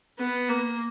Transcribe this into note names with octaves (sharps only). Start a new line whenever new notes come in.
B3
A#3